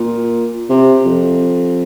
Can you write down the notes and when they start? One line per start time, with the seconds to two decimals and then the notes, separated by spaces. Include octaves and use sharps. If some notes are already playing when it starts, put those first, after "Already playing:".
Already playing: A#2
0.70 C3
1.05 F2